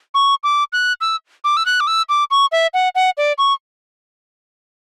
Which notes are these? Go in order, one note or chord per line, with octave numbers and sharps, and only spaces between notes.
C#6
D6
F#6
E6
D6
E6
F#6
D6
E6
D6
C#6
E5
F#5
F#5
D5
C#6